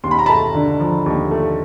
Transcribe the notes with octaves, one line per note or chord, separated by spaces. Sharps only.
D#2 C6
B5
A#5
A3 A5 B5
D3
F3
D#2
A3